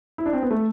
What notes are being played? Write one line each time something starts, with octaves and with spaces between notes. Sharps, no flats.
E4
D4
C4
B3
A3